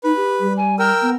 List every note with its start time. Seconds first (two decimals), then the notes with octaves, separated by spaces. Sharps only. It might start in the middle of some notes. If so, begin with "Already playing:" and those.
0.04 D#4 B4
0.16 G4
0.40 G3
0.56 G#5
0.79 A#4 G5 E6 F6
1.02 B3